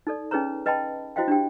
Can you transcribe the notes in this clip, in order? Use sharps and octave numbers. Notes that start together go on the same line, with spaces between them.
D#4 A4 D5
C#4 D#4 G#4 B4 C#5 A#5
B4 D#5 G5 A5 B5
E4 F#4 C5 D#5 F5 G5
D4 G4 G5